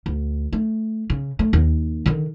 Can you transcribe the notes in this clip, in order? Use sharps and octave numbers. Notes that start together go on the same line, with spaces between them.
D2
A3
C#3
A3
D#2
D3 D#3